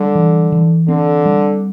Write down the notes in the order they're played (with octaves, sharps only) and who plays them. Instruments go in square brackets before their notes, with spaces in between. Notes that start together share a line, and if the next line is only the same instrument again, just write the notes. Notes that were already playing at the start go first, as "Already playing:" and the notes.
Already playing: [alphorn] D3 [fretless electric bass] G3
[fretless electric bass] E3
E3
[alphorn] D3 [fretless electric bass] C4
[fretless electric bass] G3